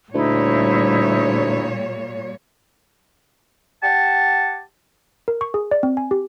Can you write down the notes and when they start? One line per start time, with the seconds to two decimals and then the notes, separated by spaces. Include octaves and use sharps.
0.14 D2 A#2 G3 D#4 E4 C#5 E5
3.83 G4 F#5 A5
5.28 A#4
5.41 C#6
5.54 G#4
5.71 D5
5.83 C4
5.97 G#5
6.11 G4